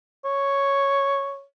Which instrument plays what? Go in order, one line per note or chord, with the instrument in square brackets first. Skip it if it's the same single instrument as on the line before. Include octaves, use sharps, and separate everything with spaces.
[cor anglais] C#5